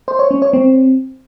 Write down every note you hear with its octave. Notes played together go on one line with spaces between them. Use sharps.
C5
C#5
C#4
C#5
C4